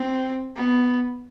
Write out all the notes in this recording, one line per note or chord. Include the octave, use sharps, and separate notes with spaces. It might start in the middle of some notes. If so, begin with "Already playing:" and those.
Already playing: C4
B3